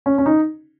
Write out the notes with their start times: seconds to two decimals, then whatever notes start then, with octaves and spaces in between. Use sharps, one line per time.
0.06 C#4
0.18 C#4
0.26 D#4